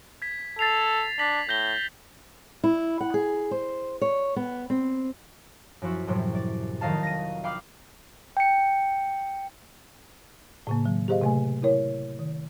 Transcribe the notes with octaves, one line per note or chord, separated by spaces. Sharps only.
G#6 B6
A4 A6 C7 F7
D4 B6 F#7
A2 G6 A#6 G7
E4
F#5
G#4
C5
C#5
B3
C4
F#2 F3 E4 F#4
F#2 A2 C3 F#3 G3
D5
F1 D#3 F#3 D#5 F5 A5
A#6 D#7
F5 G5 B5 D6 D#6 F6
G5 C#7
A2 C#3 A#3
D#3 F#3
G4 G#4 C5 D#5 F5
C3 A3 G#5
E4 A#4 C#5
D#3